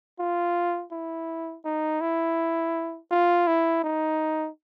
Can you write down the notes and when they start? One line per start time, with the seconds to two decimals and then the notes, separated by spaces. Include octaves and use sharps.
0.19 F4
0.92 E4
1.65 D#4
2.01 E4
3.11 F4
3.47 E4
3.84 D#4